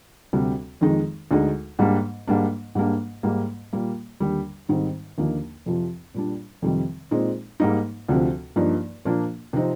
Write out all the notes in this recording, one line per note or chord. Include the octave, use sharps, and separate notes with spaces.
D2 C3 G3
F2 D#3 G#3 D#4
D2 D3 G#3 D#4
G#2 G3 A#3 D4
G#2 G3 A#3 D4
G#2 G3 A#3 D4
G#2 G3 A#3
A#2 G3 A#3
D#2 D3 G3
G#2 D#3 G3 C4 D#4
D#2 D3 F3 A#3 D#4
F2 C3 F3
A#2 G3 D4
F2 C3 D#3 G3
A#2 G#3 C4 D#4
G#2 G3 A#3 D#4
D2 C3 F3 C4
G2 F3 A#3 D#4
A#2 F3 A#3 D4
C3 F3 C4 D#4